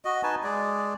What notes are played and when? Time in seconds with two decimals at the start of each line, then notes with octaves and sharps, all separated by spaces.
0.05 F#4 D#5
0.23 D#4 B4 G#5 A5
0.43 G#3 G#4 D5